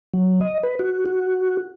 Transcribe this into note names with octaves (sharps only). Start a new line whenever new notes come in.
F#3
D#5
B4
F#4
F#4